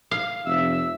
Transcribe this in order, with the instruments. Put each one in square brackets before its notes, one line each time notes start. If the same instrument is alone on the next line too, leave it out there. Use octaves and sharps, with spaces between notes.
[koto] F5
[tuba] F1 [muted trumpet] E5 [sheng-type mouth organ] E6